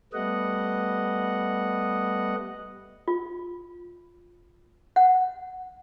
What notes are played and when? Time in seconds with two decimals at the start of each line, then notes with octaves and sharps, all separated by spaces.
0.13 G3 A3 B3 D#5 F#5
3.08 F4
4.96 F#5